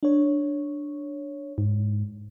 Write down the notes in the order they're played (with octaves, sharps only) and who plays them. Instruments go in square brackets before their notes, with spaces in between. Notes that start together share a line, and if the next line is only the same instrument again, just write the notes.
[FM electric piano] D4 C#5
[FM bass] G#2